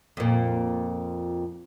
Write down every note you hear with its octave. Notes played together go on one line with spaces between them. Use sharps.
F2 A#2